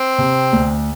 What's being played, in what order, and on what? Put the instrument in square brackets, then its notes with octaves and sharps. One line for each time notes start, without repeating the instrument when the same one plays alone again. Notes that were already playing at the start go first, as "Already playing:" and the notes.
Already playing: [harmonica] C4
[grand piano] C3
D2